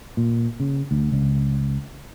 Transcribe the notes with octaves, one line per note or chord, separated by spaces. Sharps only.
A#2
C#3
D2
C#2